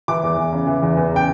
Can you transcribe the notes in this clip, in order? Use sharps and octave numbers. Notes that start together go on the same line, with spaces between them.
E3 D6
E2
E2
C#3
E3
E2
E2
C#3 G5